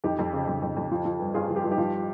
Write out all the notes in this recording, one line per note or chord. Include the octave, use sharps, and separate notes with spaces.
F2 D#4 G4
F2
C#3
F2
F2
F2
F3
F3
G2
G2 F4 G#4
F3
G4
G2 F4
D#4 G4
F3